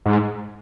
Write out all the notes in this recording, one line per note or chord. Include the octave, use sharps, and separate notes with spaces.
G#2